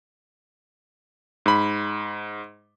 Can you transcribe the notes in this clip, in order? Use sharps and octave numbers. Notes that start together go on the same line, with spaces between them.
G#2 B5